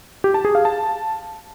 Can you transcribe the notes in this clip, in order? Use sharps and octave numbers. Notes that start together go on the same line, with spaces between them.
G4
A5
G#4
F5
A5